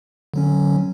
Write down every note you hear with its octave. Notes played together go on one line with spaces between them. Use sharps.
D3 F#3 C#4